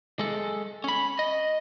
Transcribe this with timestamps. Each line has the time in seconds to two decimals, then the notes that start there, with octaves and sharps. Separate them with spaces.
0.19 G#3 A4
0.84 C#4 B5
1.19 D#5